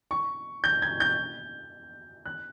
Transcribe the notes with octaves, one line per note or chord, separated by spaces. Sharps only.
C#6
G6
G#6
G6
F#6